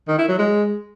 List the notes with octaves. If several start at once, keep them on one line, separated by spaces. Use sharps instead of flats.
D#3
E4
F#3
G#3